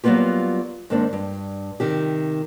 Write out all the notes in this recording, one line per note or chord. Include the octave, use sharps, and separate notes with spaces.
F#3 G3 A#3 B3 F4 G4
G#2 D#3 A#3 C4 D4
G2
C3 D#3 G4